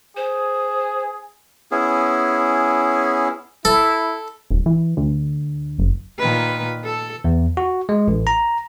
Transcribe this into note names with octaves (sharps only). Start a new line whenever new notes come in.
G#4 C5
B3 C#4 E4 G#4
E4 A4
D#1
E3
D2
F#1
A#2 D#3 B4
A4
E2
F#4
G#3
A1
A#5